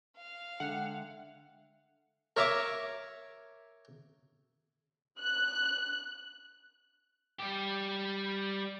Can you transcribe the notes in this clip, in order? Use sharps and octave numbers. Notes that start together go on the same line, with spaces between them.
F5
D3 G#3 E5 F#5 G5
A#4 C#5 E5 A#5 D6
F#6
G3 G4